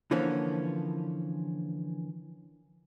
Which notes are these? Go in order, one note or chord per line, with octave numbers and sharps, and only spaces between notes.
D3 E3 F3 A#3 C#4